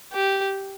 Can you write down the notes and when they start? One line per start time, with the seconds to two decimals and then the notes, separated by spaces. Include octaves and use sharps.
0.13 G4